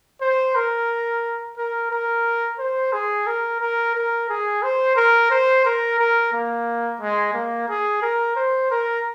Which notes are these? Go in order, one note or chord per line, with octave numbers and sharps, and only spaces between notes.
C5
A#4
A#4
A#4
C5
G#4
A#4
A#4
A#4
G#4
C5
A#4
C5
A#4
A#4
A#3
G#3
A#3
G#4
A#4
C5
A#4